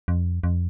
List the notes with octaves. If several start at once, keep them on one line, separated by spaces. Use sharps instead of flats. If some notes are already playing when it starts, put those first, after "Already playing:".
F2
F2